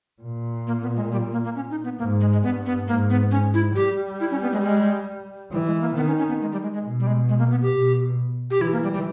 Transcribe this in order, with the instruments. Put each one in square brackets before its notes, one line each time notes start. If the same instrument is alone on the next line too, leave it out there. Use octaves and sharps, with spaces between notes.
[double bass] A#2
[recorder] A#3
B3
G#3
G3
A#3
A#3
C#4
D#4
B3
[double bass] G#2 [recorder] A#3
[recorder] G#3
G#3
[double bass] G2 [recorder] B3
[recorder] B3
[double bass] G#2 [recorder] A#3
[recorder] B3
C#4
E4
[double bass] G3 [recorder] G4
[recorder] E4
C#4
B3
G#3
G#3
[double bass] E3 [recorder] G3
[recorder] G#3
A#3
[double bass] D#3 [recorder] B3
[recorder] C#4
C#4
B3
G#3
G3
G#3
G#3
[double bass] B2
[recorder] G3
G#3
G#3
A#3
B3
G4
[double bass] B2
[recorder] G4
[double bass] E3 [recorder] E4
[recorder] A#3
G3
G3